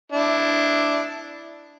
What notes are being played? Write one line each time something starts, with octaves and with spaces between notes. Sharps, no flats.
D4 E4